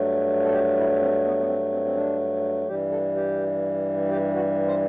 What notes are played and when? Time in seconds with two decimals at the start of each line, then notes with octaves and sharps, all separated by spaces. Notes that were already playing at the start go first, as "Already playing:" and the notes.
Already playing: G2 F#3 A3
0.44 A4
0.52 G4
0.77 E4
1.00 C4
1.25 B3
1.40 B3
1.48 C4
1.72 C4
1.85 C4
1.95 D4
2.68 G2 E3 G3 G4
2.91 A4
3.16 G4
4.10 G4
4.34 F#4
4.68 C5